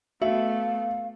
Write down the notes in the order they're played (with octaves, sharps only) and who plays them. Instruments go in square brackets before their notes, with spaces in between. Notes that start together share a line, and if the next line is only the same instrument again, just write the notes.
[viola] A3 B3 [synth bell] F#4 [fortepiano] E5 [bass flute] F5